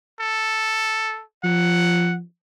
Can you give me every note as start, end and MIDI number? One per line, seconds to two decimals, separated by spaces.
0.20 1.22 69
1.44 2.22 53
1.44 2.15 78